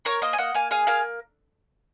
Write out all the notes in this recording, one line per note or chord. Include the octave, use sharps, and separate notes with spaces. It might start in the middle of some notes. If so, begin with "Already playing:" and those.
A#3 A#4 C#5
A#3 C5 D#5
G#5
A#3 D#5 F#5
A#3 F5 G#5
G#4 F5 G#5
A#3 F5 G#5